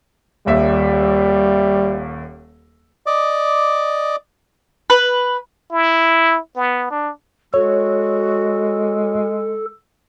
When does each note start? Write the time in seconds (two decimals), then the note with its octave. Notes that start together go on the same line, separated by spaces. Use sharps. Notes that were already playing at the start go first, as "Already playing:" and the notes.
0.46 D#1 D#2 G3 E5
3.06 D5 D#5 D6
4.90 B4
5.72 E4
6.56 B3
6.91 D4
7.54 G#3 F#4 A4 C#5